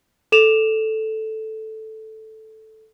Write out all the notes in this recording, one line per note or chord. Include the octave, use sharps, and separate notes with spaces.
A4 E7 F7